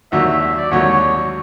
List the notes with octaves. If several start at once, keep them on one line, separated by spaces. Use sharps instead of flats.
D#2 D3 F#3 E5
E5
E5
D5
D#2 D3 F#3 C#5